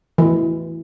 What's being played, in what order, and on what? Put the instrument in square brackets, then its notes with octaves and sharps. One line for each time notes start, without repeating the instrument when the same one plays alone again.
[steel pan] E3